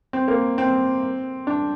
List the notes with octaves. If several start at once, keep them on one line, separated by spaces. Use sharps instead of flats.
C4
A#3
C4
D4